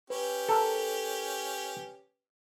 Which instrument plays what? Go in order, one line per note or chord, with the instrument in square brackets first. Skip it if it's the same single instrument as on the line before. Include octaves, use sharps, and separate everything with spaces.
[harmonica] C#4 G4 [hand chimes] B4
[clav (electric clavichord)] A4 A#4